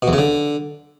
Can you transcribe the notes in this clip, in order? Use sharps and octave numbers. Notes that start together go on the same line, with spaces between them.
B2
E2
C#3
D3